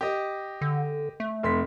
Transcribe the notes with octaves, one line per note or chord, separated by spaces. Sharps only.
G4 D#5
D3
A3
F1 C6 B6